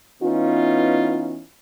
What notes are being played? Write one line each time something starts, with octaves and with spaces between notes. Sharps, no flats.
E3 B3 C#4 D#4 F4